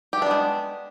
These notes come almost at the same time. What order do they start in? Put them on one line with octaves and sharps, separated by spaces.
G4 A3 D4 B3 G#3